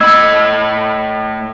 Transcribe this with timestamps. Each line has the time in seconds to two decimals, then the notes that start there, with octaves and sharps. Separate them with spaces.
0.01 A2 D#5 B5 E6 G#6